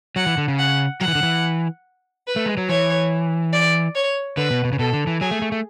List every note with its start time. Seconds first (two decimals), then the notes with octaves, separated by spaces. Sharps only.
0.16 F#3 F#5
0.26 E3
0.38 D3
0.48 C#3
0.59 F#5
1.01 F#3 F#5
1.08 E3
1.15 D3
1.23 E3
2.27 B4
2.36 A3
2.46 G#3
2.57 F#3
2.69 E3 C#5
3.53 D5
3.95 C#5
4.37 D3 B4
4.51 B2
4.65 B2
4.73 C#3
4.79 B2 A4
4.93 D3
5.07 E3
5.21 F#3 G#4
5.31 A3
5.42 A3
5.52 A3